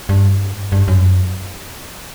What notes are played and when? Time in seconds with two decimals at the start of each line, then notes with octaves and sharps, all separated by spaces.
0.09 G2
0.72 G2
0.88 F#2